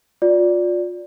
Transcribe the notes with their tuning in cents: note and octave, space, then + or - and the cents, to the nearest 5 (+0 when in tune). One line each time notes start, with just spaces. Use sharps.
F4 +30 D5 -10